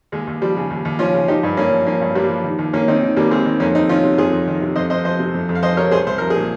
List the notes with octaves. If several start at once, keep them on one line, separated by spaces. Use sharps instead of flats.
D#2 G#3
D#2
F3 G3
C#3
D#2
D#2
F3 C#4 F4
C#3
F3 D#4 G4
G2
G2 A#3 C#4
F3
F3 A#3 C#4
G2
G2 G3 A#3
F3
D#3
D#2
D#2 A#3 C#4
D#3 C4 D#4
D#3
D#2 G3 A#3
D#2 G#3 C4
D#3
F2 A#3 C#4
F2 C4 D#4
D#3 C#4 F4
C3
F2 F4 G#4
F2
D#3
C3
F2 C5 D#5
F2 C5 D#5
F3 C5 D#5
C3
F2
F2
F5
F3 C5 D#5
C3 A#4 C#5
C2 G#4 C5
C2 C5
F3 A#4
G#4
A#2